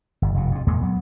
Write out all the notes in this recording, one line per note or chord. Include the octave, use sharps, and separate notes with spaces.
G1
F1 B2
F2 C3
E2 A#2 G#3 A#3
F#3 B3